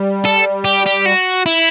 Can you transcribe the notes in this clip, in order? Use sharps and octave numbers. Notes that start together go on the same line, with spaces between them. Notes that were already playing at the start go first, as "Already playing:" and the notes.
Already playing: G3
A4
G4
G4
F#4
E4